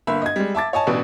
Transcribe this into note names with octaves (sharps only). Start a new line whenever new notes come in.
G1 A#3 E5 B5
D#5 G#6
G3 G#3
E5 A5 D6 A6
C#5 D#5 G#5 A5
A1 B2 D4